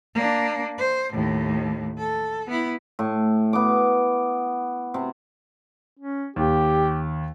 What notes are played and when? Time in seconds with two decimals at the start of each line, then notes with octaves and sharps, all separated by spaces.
0.14 A#3 D4
0.78 C5
1.12 D#2 A2
1.99 A4
2.47 B3 E4
2.99 A2
3.53 B3 D6
4.94 C3
5.99 C#4
6.36 D#2 G4